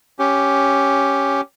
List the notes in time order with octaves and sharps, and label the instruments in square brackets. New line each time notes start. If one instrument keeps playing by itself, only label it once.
[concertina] C#4 G4